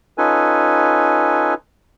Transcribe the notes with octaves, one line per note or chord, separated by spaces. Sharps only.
C#4 D#4 F4 A4 B4 G#5